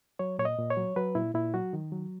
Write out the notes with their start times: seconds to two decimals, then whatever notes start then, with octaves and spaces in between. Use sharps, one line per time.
0.19 F#3 C#5
0.39 A#2 C#5
0.45 D#5
0.58 A#2
0.71 C#5
0.77 F#3
0.96 F#3 B4
1.15 A#2 E4
1.34 A#2 E4
1.54 F#3 F#4
1.73 D#3
1.92 F#3